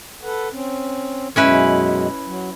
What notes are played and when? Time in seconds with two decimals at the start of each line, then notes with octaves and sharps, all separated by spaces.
0.23 A4 B4 F#5
0.51 C4 C#4
1.36 F#2 B2 G#3 C#4 E4 B4
2.25 F#3